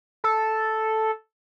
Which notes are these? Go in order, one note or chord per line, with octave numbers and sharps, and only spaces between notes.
A4